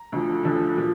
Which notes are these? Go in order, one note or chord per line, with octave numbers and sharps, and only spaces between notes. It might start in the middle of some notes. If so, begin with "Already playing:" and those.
Already playing: A#5
D2 D3 F3
D2 D3 F3
A#2 F3